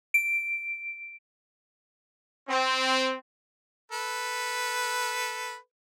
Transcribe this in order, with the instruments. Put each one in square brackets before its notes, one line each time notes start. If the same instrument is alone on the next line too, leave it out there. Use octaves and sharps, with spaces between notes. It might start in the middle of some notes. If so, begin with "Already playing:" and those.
[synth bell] D7
[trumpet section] C4
[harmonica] A4 B4